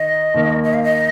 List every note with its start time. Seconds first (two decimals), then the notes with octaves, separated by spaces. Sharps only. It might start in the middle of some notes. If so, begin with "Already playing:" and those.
Already playing: D#3 D#5
0.34 D#2 D#3 A#3
0.64 D#5
0.74 F5
0.84 D#5